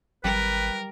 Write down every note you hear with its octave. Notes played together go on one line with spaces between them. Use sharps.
G#1 G3 A#4 B4